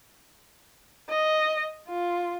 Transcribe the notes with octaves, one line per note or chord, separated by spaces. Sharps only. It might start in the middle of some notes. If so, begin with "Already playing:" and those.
D#5
F4